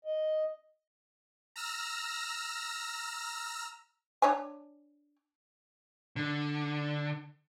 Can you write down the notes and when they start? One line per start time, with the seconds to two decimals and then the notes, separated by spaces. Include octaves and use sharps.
0.05 D#5
1.56 A#5 E6 F6 A#6
4.22 D4 C#5 G#5
6.16 D3